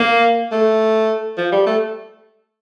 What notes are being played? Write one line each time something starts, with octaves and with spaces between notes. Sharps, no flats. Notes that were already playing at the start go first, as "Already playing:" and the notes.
Already playing: A#3
A3
F3
G3
A3